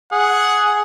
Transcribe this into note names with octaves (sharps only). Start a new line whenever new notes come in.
G#4 F#5